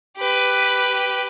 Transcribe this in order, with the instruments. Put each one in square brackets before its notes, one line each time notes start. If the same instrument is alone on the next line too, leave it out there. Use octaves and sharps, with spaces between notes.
[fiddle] G4 B4